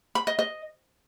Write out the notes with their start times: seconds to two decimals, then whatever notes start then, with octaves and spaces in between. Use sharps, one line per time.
0.15 B5
0.27 D#5
0.39 D#5